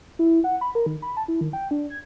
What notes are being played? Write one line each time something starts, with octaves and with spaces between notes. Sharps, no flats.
E4
F#5
B5
A#4
D#3
B5
A5
E4
D#3
G5
D4
G#6